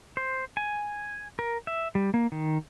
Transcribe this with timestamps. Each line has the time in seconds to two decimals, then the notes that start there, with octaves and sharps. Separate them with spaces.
0.17 C5
0.57 G#5
1.39 A#4
1.67 E5
1.95 G3
2.14 A#3
2.32 D#3